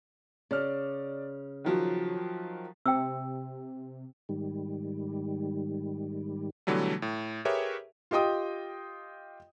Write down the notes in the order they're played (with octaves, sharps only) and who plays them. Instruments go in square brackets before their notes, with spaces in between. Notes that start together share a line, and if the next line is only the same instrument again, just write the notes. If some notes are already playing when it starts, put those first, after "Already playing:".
[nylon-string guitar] C#3 [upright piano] D5 F6
[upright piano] D#3 F3 F#3
[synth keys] C3 [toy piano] G5 E6
[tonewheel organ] G#2 D#3 G3
[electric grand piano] B2 D3 E3 F#3 G3 A3
A2
G4 G#4 A#4 B4 C#5 E5
[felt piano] F4 G4 D#5 G5 D#6